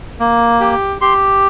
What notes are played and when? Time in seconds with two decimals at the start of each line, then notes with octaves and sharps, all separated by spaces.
0.20 A#3
0.61 G4
1.01 G4 C6